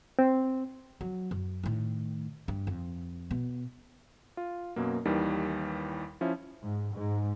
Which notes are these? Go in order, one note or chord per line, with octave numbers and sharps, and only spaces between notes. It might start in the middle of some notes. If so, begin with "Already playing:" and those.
C4
F#3
F#2
A2 D#3
G2
F2
B2
F4
F#2 B2 A#3
D#2 D#3 E3 G3
F3 C#4 E4 E5
G#2
G#2